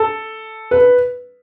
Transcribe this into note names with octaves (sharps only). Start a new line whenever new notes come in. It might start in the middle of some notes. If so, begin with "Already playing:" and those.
Already playing: A4
B4